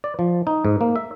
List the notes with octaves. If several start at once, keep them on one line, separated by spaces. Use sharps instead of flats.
D5
F3
D#4
G#2
A#3
E5